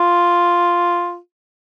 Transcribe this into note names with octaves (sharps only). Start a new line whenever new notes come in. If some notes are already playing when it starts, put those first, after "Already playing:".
Already playing: F4